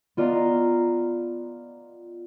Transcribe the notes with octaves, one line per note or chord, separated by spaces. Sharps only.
B3 F4 D5 D#5 A#5